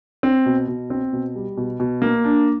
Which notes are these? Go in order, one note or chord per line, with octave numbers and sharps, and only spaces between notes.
C4
B2
B2
C4
B2
G3
B2
B2
A#3
D4